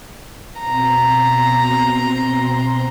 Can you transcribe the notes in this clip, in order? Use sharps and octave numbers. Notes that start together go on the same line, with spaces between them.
B2 C4 A#5 C6